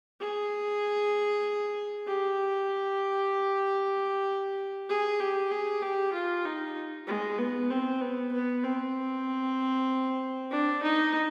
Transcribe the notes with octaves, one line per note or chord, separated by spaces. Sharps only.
G#4
G4
G#4
G4
G#4
G4
F4
D#4
G#3
B3
C4
B3
B3
C4
D4
D#4